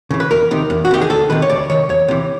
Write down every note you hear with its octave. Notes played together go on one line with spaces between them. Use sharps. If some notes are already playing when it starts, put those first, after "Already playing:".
C#3 E3
B4
E2 A#4
C3 D#3
E2
F#4
C3 D#3 G4
G#4
D2 A4
C3 D#3 B4
C#5
D2 D5
C3 D#3 C#5
E2 C#5
C3 E3